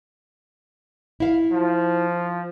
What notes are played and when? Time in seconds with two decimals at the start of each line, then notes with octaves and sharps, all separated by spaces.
1.20 E4 F5
1.52 F3